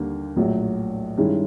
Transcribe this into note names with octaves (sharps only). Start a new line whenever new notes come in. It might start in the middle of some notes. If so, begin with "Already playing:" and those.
Already playing: D#2 D3 G3 A#3
A#1 A2 F#3
G2 D#3 G#3 C#4 E4